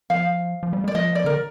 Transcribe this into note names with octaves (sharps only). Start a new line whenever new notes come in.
F3 F5
F3
G3
G#3 D5
F3 D#5
D5
D3 A#4